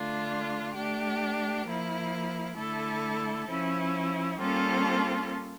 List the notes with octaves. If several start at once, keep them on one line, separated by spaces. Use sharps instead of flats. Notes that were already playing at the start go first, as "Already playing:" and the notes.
Already playing: D3 A3 D4 F4
A3 D4 G4
F3 A#3 E4
D3 A3 E4 A4
F3 C#4 E4
G3 A#3 C#4 F4 A4